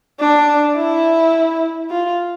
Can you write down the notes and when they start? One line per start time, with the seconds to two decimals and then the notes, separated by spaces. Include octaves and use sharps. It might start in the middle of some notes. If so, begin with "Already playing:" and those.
0.20 D4
0.77 E4
1.90 F4